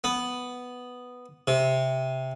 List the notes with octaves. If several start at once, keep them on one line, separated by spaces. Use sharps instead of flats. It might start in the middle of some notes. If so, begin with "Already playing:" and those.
B3
C3